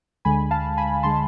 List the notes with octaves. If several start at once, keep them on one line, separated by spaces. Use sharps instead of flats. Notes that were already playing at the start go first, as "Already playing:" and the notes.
D2 D3 G#3 G#5 B5
F5 A5
G#5 B5
D3 G#3 A5 C6